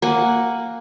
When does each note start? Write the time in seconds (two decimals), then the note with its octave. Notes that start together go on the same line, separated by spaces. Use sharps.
0.02 A#3 F#5 G#5